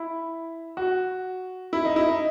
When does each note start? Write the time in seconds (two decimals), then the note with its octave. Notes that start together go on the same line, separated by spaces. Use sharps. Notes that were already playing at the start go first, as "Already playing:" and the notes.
Already playing: E4
0.77 F#4
1.73 E4
1.85 D#4
1.96 E4
2.09 D#4